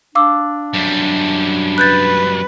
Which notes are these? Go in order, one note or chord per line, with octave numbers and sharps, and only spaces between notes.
D4 F5 D6 E6
F#2 G3
B4 F#6 G6 A6